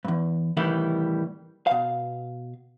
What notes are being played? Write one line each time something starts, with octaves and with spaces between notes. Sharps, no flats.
E2 G2
C2 A2 D#3 E3 G3 E4
B2 F5